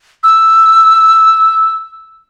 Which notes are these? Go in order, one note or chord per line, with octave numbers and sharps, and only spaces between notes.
E6